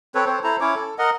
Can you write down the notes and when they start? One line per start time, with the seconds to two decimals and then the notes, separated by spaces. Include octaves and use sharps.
0.15 C4 A4 B4 C#5
0.26 C4 A4 C5 C#5
0.44 E4 A4 C5 A#5
0.61 C#4 E4 C#5 D6
0.75 A4
0.98 A#4 D#5 F#5